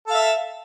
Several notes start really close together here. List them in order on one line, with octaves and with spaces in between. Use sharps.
A4 F5 E5